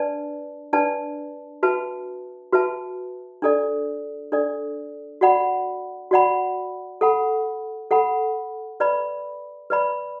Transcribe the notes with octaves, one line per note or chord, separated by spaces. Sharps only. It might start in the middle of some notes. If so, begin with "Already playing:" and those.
Already playing: D4 B4 D5 A5
D4 B4 D5 A5
F#4 B4 E5 A5
F#4 B4 E5 A5
D4 A4 D5
D4 A4 D5
F#4 D5 F#5 B5
F#4 D5 F#5 B5
A4 F#5 B5
A4 F#5 B5
B4 D5 B5
B4 D5 B5